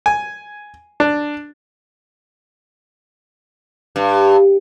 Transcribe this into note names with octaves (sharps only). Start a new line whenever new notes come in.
G#5
D4
G2